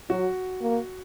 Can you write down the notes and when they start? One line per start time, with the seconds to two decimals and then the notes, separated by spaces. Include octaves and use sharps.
0.10 F#3 F#4
0.62 A#3